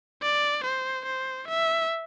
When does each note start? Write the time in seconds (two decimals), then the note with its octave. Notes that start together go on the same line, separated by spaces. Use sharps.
0.22 D5
0.64 C5
1.06 C5
1.48 E5